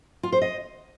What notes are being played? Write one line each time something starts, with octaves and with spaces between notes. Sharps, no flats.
F4
C5
D#5